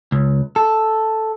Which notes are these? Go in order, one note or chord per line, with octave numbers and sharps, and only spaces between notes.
C#2
A4